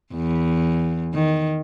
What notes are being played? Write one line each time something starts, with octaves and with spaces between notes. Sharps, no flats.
E2
D#3